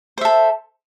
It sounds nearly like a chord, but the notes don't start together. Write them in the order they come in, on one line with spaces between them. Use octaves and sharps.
C5 E5 A4